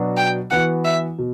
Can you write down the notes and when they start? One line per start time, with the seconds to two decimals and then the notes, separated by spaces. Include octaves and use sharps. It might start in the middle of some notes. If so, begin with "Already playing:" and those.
Already playing: B2 F#3 B3 D4 F#4
0.17 G5
0.51 E3 B3 F#4 F#5
0.84 E5
1.18 B2